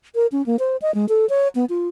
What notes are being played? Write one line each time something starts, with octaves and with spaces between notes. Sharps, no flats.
A#4
C#4
A#3
C5
D#5
G#3
A4
C#5
B3
F4